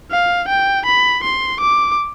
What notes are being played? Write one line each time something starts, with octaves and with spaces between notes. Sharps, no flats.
F5
G5
B5
C6
D6